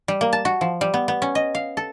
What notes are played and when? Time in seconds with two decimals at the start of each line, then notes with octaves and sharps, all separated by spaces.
0.08 G3
0.21 A#3
0.33 A5
0.45 F#4
0.61 F3
0.81 G3
0.94 B3
1.08 B3
1.22 C#4
1.35 D#5
1.55 F5
1.77 A4